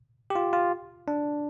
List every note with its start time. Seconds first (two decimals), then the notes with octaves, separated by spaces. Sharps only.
0.30 G4
0.35 F4
0.53 F4
1.08 D4